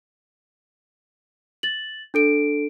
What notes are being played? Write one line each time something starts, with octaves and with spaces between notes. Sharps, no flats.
A6 F#7
D4 A4 D7